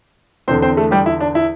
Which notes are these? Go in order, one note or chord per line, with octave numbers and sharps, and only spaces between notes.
E2 D3 C4 C5
C4 C5
A3 A4
G3 G4
E4
D4
E4